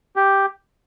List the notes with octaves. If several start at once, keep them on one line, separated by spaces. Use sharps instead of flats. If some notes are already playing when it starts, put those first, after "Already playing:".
G4